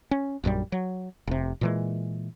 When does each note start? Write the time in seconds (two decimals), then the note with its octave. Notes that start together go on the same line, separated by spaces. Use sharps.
0.11 C#4
0.44 A#1 F#2 F3 G3
0.72 F#3
1.27 F1 C3
1.61 A#2 E3 G#3